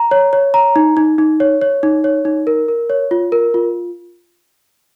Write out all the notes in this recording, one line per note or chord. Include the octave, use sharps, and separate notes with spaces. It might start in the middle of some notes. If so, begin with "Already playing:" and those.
Already playing: A#5
C#5
C#5
A#5
D#4
D#4
D#4
C#5
C#5
D#4
C#5
D#4
A#4
A#4
C#5
F4
A#4
F4